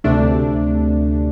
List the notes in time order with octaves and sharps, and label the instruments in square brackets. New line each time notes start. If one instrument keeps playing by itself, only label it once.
[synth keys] D2 C3 A3 D4